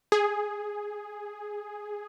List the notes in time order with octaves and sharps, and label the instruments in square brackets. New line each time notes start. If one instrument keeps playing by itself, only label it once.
[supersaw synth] G#4